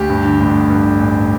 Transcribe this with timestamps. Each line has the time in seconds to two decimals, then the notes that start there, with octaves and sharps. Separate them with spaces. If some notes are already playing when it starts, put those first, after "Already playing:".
Already playing: D2 G4
0.10 G2
0.25 D3
0.40 A1
0.54 A1
0.70 G2
0.86 D3
1.01 A1